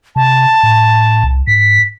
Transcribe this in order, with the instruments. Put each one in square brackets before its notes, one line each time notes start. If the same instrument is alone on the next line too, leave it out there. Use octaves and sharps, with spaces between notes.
[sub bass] C3 [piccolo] A5
[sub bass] A2
C2
[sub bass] G#2 [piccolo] B6